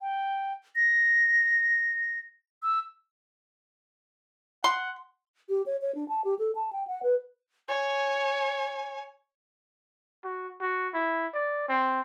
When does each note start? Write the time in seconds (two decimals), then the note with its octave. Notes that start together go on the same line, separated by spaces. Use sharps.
0.01 G5
0.76 A#6
2.63 E6
4.64 F#5 C6
5.49 G4
5.66 C#5
5.82 C#5
5.95 D4
6.09 A5
6.25 G4
6.39 A4
6.55 A5
6.73 G5
6.87 F#5
7.03 B4
7.69 C#5 G#5
10.24 F#4
10.61 F#4
10.94 E4
11.34 D5
11.69 C4